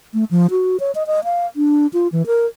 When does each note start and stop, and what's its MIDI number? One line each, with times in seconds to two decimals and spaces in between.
0.14 0.24 57
0.31 0.47 53
0.51 0.80 66
0.80 0.92 73
0.95 1.06 75
1.07 1.24 75
1.24 1.46 77
1.56 1.87 62
1.93 2.08 65
2.12 2.25 52
2.26 2.46 70